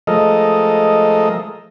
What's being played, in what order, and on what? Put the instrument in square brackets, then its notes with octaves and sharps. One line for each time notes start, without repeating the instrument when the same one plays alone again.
[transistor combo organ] F3 G#3 A3 A4 A#4 D#5